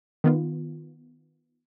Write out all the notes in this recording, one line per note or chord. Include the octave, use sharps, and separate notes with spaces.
D#3 B3 F4